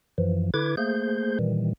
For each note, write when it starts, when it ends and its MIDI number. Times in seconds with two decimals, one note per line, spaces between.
0.18 0.50 42
0.18 0.50 52
0.18 0.50 53
0.54 0.76 50
0.54 0.76 64
0.54 0.76 71
0.54 0.76 86
0.54 0.76 92
0.77 1.39 57
0.77 1.39 58
0.77 1.39 68
0.77 1.39 72
0.77 1.39 91
1.39 1.73 46
1.39 1.73 51
1.39 1.73 52
1.39 1.73 55